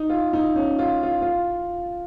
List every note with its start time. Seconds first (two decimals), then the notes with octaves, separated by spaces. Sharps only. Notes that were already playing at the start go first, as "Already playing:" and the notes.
Already playing: D#4
0.09 F4
0.33 D#4
0.56 C#4
0.79 F4
1.03 F4
1.22 F4